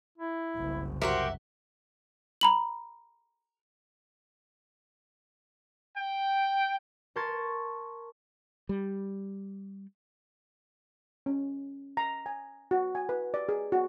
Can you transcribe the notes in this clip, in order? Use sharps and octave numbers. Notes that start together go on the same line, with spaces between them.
E4
F#1 C2
F#4 G4 A#4 C5 E5 F#5
A#5 B5 F#7
G5
A#4 A5 C6 C#6 G#6 A6
G3
C#4
A#5
G#5
F#4
G#5
B4
D5
G#4
F#4